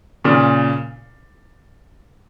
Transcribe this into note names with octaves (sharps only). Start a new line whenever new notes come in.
A#2 C#3